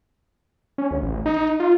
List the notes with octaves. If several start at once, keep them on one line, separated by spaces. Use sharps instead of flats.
C#4
D2
A1
D#4
F4